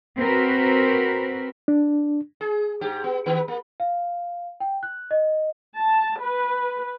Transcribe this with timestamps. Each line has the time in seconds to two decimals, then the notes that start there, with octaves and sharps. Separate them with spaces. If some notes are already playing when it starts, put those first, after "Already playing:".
0.17 C4 F#4 A#4 B4
1.68 D4
2.41 G#4
2.81 G#2 G4
3.04 B3
3.26 D#3 B3 B4
3.48 A#3
3.80 F5
4.60 G5
4.83 F#6
5.11 D#5
5.75 A5
6.21 B4